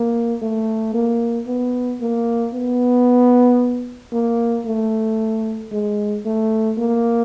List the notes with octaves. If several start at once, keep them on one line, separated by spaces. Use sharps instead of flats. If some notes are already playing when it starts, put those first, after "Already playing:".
Already playing: A#3
A3
A#3
B3
A#3
B3
A#3
A3
G#3
A3
A#3